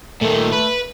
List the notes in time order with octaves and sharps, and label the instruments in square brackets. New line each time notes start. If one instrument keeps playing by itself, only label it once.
[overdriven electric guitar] A#2 D#3 [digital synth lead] A3
[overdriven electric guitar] B4